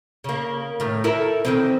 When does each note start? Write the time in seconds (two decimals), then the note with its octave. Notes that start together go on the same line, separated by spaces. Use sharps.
0.24 C#3 A#3
0.80 A2 D#3
1.04 E4 A4 A#4
1.45 D#3 E3 C4